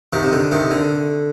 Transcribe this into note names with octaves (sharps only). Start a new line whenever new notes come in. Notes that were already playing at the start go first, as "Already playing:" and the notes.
C3 D#3
C3
D3
C3 D#3
D3